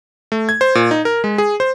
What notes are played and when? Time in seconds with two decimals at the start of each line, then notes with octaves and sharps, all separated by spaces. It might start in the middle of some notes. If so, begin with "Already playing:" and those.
0.32 A3
0.49 G#6
0.61 C5
0.75 A#2
0.91 D#4
1.05 A#4
1.24 G#3
1.38 G#4
1.60 C5